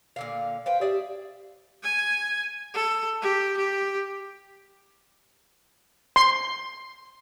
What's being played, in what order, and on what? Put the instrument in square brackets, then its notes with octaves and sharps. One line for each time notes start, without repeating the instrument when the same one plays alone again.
[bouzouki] A#2 D3 F5
[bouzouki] B4 C5 G5 [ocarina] F5
[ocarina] G4 [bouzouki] G#4 D5 E5
[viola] G#5
A4
G4
G4
[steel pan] C6